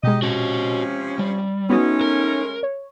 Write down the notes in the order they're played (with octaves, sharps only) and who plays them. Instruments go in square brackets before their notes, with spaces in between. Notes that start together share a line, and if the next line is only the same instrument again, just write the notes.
[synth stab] B2 G#3 [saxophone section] D#4 G4 D#5
[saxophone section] C3 F3 C#4 [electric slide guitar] F#4 D#5
[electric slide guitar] G3
[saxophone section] G#3 A3 C#4 [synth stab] B3 F#4 D#6 [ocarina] D#4
[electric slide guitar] A#4
[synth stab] C#5